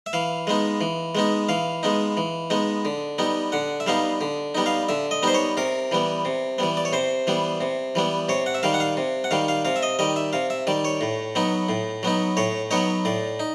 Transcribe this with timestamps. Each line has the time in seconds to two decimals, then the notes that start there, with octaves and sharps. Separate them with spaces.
0.06 E5
0.13 E3 F5
0.47 G#3 B3 D#4
0.81 E3
1.15 G#3 B3 D#4
1.49 E3 F5
1.83 G#3 B3 D#4
2.17 E3
2.50 G#3 B3 D#4
2.85 D3
3.18 G3 B3 D#4
3.52 D3 F#5
3.80 E5
3.86 G3 B3 D#4 F5
4.21 D3
4.55 G3 B3 D#4
4.66 F5
4.89 D3 E5
5.11 D#5
5.23 G3 B3 D#4 C5
5.34 C#5
5.57 C3 A#4
5.91 E3 G3 B3
6.25 C3
6.58 E3 G3 B3
6.77 D5
6.85 C#5
6.93 C3 C5
7.27 E3 G3 B3
7.61 C3
7.95 E3 G3 B3
8.29 C3 C#5
8.46 F#5
8.54 E5
8.63 D#3 G3 F5
8.74 F#5
8.80 F5
8.97 C3
9.24 F#5
9.31 D#3 G3 F5
9.48 F5
9.65 C3 F5
9.76 E5
9.83 D#5
9.99 D#3 G3 D#5
10.16 E5
10.33 C3 F5
10.50 E5
10.67 D#3 G3 D5
10.85 C#5
11.01 A2
11.35 F#3 B3 D#4
11.69 A2
12.03 F#3 B3 D#4
12.37 A2 C#5
12.71 F#3 B3 D#4 C#5
13.05 A2 D5
13.40 D#4